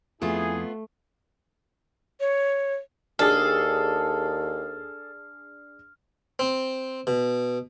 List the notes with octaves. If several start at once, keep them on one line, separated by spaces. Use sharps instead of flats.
F2 A3 B3 E4 F4 G#4
C#5
D#2 D4 G#4 A4 F6
C4
B2